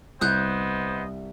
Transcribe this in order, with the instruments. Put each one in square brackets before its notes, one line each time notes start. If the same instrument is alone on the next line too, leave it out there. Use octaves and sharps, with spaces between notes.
[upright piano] C2 [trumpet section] B3 C5 D#5 [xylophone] D#6 F#6 G6